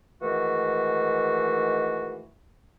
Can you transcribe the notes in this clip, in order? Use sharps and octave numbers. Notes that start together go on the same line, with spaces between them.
G#2 D#3 E3 A3 F#4